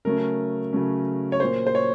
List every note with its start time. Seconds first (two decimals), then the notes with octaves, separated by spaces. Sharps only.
0.05 C#3 F#3 A3 C#4 A#4
0.73 C#3 F#3 A3 C#4
1.32 C#5
1.40 A#2 F#3 A#3 C5
1.67 C5
1.75 C#5